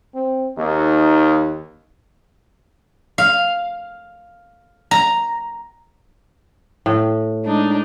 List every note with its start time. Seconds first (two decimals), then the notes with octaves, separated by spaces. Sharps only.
0.14 C4
0.57 D#2 D#4
3.18 F5
4.91 A#5
6.86 A2
7.44 G#3 D4 D#4